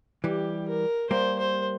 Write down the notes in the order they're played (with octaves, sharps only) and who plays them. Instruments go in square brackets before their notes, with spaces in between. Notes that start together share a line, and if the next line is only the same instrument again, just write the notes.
[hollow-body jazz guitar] E3 G3 [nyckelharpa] G4
[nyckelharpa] A#4
[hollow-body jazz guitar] G3 A#3 [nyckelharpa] C5
[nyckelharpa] C5